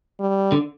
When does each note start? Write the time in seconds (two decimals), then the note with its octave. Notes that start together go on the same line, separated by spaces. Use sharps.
0.20 G3
0.52 D3